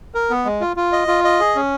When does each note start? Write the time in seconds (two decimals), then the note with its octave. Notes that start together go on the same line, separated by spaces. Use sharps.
0.15 A#4
0.30 B3
0.45 G#3
0.61 F4
0.77 F4
0.92 D#5
1.08 F4
1.24 D#5
1.40 G#4
1.56 C#4